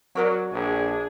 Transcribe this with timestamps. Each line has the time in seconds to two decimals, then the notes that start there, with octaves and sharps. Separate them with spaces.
0.15 F#3 F#4 A#4 D5
0.53 A#1 D4 G#4